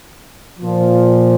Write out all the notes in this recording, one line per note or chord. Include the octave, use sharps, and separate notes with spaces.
A#2 F3